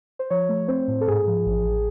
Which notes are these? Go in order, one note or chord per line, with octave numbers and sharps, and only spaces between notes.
C5
F3 C#5
A3
C4 C5
A2
A4
G#2 G#4
F3
A1
A1